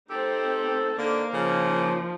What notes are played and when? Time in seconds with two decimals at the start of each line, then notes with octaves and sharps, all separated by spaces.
0.10 A3 C4 D#4 G4 A4
0.98 D3 A#3 D#4 A#4 C5
1.34 C#3 F3